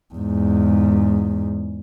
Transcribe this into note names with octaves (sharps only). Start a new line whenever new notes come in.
E2 G#2